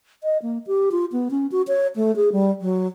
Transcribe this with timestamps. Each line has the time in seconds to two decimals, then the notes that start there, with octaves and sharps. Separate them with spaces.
0.23 D#5
0.42 A#3
0.67 G4
0.92 F4
1.12 B3
1.31 C#4
1.52 F#4
1.68 C#5
1.96 A3
2.16 G#4
2.32 G3
2.61 F#3